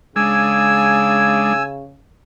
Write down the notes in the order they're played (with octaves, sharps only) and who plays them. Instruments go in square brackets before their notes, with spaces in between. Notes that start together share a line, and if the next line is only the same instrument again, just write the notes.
[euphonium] C#3 [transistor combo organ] G#3 D4 G#4 [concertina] G#5 E6